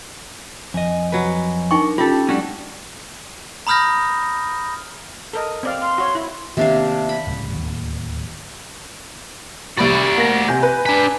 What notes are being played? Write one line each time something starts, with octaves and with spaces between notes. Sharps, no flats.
F2 D#5 G#5
F#3 B4 G#5
D4 D#4 A#4 G5 C#6
C#4 F4 G4 A4
F#3 G#3 C#4 D4 F#4 D5
A#5 B5 D#6 F6 G6 A#6
A4 A#4 D#5
C4 D5 F5
F5 C6
F#4 C#5
E4
C3 D#3 A#3 B3 D4 F5
B5
D1 C#2 G2
D1 D#2
C2 F#4 D5 B5 A6
A#3 A#6
C3 G#5 G6
B4
D4 G#5 A#5 B5